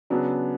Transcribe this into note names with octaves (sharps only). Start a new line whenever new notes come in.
C#3 F#3 B3 D4